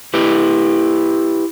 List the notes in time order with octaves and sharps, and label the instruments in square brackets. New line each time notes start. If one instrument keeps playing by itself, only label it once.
[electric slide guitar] E4 G4 B4